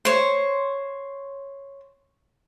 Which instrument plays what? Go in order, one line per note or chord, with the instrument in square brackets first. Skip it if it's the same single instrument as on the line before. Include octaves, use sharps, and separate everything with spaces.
[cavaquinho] C5 C#5